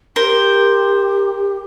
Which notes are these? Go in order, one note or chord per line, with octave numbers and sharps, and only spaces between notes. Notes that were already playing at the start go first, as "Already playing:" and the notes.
G4 A#4 C5